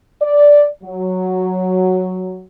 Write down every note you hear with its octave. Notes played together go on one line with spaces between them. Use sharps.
D5
F#3